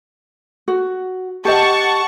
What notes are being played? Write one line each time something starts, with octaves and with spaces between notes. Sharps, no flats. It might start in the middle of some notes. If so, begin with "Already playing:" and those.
F#4
G4 D#5 F#5 A5 C#6